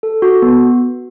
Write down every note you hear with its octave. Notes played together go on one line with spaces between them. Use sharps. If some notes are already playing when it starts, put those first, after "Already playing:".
A4
F#4
B3